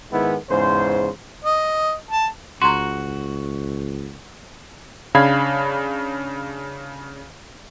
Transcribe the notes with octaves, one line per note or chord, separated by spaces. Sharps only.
G#2 D#3 G#3 B3 E4
E2 G#2 C#3 C5
D#5
A5
C#2 F#4 A#5 C6
C#3 D4 F5 B5 G#6